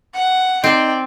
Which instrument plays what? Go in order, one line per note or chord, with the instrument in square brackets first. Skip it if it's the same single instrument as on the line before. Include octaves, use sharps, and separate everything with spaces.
[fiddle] F#5
[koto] C4 [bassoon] D#4 [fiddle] D5 G5